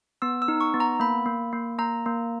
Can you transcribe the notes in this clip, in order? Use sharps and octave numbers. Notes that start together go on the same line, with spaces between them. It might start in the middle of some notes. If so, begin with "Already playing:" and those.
B3 E6
E6
D#4
C#6
B3
A#5
A#3 B5
A#3
A#3
A#3 A#5
A#3